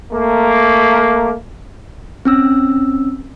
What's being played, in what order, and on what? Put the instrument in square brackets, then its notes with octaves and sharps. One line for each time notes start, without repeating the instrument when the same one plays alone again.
[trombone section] A3 A#3
[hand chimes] C4 C#4 E6